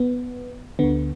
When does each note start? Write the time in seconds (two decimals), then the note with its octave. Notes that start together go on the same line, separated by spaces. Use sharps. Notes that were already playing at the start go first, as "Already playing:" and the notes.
Already playing: B3
0.79 D2 D3 B3